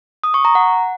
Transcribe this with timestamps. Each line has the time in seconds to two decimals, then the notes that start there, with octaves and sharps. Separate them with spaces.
0.24 D#6
0.34 C#6
0.45 A#5
0.55 F#5